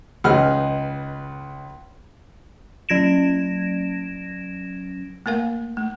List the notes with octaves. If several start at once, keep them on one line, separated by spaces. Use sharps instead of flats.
C#2 D#4 G#4 B4 F6
F#3 C#4 G#6 A#6 D7 E7
A3 A#3 A#4 F5
A3